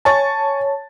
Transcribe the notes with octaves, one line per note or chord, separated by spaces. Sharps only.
C#5 G#5 A5 C#6 A6